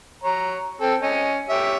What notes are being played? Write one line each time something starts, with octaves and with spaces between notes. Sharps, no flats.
C#5 A#5
C4 A4
C#4 D#5
G4 C#5 E5